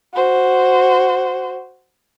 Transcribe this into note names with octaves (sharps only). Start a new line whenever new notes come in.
F#4 C5